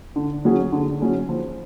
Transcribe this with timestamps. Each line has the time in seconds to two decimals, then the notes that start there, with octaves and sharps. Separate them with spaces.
0.16 D3
0.45 F#3 C#4 G#4
0.72 D3
1.01 F#3 C#4 G#4
1.29 F3